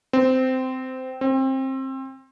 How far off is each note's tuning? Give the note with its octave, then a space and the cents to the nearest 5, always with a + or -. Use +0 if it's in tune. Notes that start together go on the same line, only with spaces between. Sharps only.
C4 -15
C4 +25